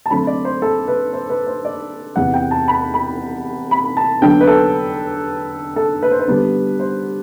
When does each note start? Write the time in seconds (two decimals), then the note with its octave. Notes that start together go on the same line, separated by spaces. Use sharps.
0.06 A5
0.11 D3 F#3 A3 C4 B5
0.27 D5
0.45 C5
0.62 A4
0.88 B4
1.13 C5
1.30 B4
1.47 C5
1.65 D5
2.16 E2 C3 E3 B3 F#5
2.34 G5
2.51 A5
2.68 B5
2.94 B5
3.71 B5
3.97 A5
4.22 D3 F#3 B3 D4 G5
4.41 B4
4.47 A4
5.76 A4
6.03 B4
6.11 C5
6.19 B4
6.28 D3 G3 B3 D4
6.80 C5